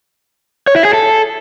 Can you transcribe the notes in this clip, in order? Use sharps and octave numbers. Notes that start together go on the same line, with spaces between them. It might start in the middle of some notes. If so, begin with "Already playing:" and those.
C#5
E4
G#4
A4